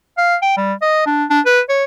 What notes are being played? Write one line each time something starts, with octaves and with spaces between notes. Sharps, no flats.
F5
G5
G3
D#5
D4
D4
B4
C#5